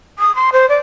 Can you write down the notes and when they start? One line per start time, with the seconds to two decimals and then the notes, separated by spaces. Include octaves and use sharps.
0.19 D#6
0.36 C6
0.52 C5
0.69 D5